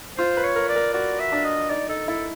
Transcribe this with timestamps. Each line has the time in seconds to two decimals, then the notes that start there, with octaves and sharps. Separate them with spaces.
0.18 F4 C5
0.37 B4
0.44 C#5
0.56 A#4
0.69 D5
0.76 A#4
0.94 F#4 D5
1.20 E5
1.32 D4
1.45 D#5
1.70 D#4 D5
1.89 D#4 A4
2.08 E4 A4